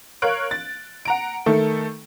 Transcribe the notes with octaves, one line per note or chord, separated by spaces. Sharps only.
A#4 C#5 F5 F#6 D7
A6
F#5 A#5 D7
D#3 A3 A4